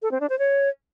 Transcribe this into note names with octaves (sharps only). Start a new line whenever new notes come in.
A4
C4
D4
C5
C#5